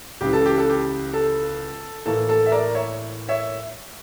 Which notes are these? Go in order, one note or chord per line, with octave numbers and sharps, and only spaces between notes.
C#2 C#3 E3 G4
A4
G4
A4
G4
A4
A2 E3 A#3 A4
A4
E5
A#4 D5
C#5 E5
C#5 E5